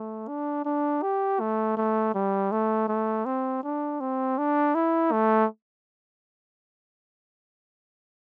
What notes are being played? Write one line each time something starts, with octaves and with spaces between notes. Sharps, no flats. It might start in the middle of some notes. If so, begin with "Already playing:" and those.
Already playing: A3
D4
D4
G4
A3
A3
G3
A3
A3
C4
D4
C4
D4
E4
A3